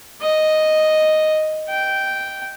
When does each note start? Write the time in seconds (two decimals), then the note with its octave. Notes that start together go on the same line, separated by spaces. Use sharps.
0.21 D#5
1.70 G5